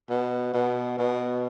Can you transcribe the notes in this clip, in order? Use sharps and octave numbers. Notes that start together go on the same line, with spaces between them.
B2
B2
B2